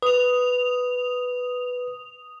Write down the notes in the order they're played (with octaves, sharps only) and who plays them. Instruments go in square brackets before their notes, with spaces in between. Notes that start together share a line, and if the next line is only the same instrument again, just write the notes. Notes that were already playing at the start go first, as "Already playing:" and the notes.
[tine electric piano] B4 [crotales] D#6 F7